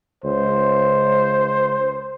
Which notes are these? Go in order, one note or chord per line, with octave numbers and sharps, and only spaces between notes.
C#2 C5